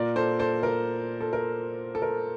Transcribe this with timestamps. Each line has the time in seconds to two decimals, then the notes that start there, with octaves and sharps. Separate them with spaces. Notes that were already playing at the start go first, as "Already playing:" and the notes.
Already playing: A#2 A#4 D5
0.16 A4 C5
0.39 A4 C5
0.63 A#4
1.21 A4
1.33 A#4
1.95 A4
2.02 A#4